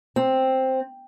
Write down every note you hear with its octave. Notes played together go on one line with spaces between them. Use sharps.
C4